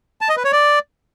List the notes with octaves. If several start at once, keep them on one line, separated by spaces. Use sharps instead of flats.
A5
D#5
B4
C#5
D5